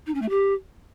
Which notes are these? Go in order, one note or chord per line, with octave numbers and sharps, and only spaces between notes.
D#4
C#4
A3
G4